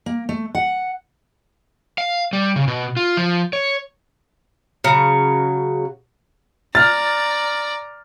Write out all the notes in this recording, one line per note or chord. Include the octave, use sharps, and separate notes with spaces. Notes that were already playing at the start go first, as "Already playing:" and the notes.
A#3
A3
F#5
F5
G3
C#3
B2
F4
F3
C#5
C#3 F#3
D5 A#5 F6 A6